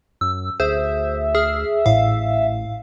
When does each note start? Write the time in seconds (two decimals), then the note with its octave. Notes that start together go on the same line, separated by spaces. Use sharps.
0.21 F#2 E6
0.60 D2 G#4 C5 E5
1.35 G#4 F6
1.86 A1 A2 F5